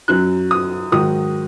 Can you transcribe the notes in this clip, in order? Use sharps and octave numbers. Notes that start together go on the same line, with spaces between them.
F#2 F#3 F#6
D#6
G#2 D#3 F#3 D#6